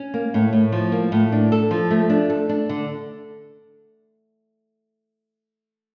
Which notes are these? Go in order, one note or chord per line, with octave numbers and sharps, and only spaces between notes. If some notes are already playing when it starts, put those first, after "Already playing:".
Already playing: C#4
A#3
A2
A2
F3
A#3
A2
D4
A4
F3
A3
D4
A4
D4
D3